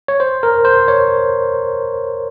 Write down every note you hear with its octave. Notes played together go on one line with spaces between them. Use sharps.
C#5
C5
A#4
C5
C#5